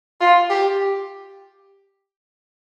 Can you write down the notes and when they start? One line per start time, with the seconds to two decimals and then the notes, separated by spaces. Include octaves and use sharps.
0.21 F4
0.50 G4